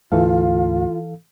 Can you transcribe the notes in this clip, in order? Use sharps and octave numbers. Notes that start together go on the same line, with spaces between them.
D2 G#2 E3 A3 F4 A4 F5